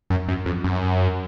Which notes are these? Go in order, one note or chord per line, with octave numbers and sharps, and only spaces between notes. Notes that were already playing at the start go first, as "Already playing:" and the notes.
F#2
F#2
F2
F#2